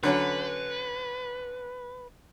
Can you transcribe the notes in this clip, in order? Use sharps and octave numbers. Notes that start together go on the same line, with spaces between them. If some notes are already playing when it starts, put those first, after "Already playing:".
D3 F#3 C#4 B4